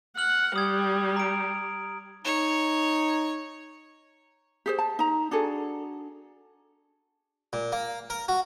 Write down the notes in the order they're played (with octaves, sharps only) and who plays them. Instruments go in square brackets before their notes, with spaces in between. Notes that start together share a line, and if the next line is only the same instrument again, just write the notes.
[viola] F#5 [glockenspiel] F6 F#7
[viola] G3 [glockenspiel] D#6 G#6
[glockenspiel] A#5 D7
[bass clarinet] D#4 [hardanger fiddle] C#5
[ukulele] G4 G#4 C5
A5
D#4 A#5
D4 F#4 G#4 A4
[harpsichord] A#2
A#3
A#4
F#4